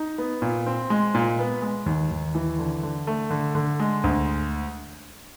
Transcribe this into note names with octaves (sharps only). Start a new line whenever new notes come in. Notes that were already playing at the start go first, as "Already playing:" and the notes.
Already playing: D#4
B3
A#2
C4
G#3
A#2
B3
G#3
D#2
D#2
E3
D3
D3
A3
D3
D3
G#3
D2